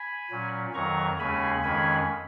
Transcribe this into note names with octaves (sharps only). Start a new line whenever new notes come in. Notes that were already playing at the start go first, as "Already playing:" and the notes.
Already playing: G#5 B5
A#2 F#3 C#4
F2 D#3 F#3 A#5 C#6
D#2 C#3 G#3 C#4 G#5 B5
F2 D#3 G#3 C#4 G#5 B5